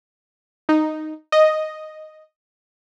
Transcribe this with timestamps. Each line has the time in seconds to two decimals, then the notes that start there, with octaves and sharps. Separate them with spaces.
0.69 D#4
1.32 D#5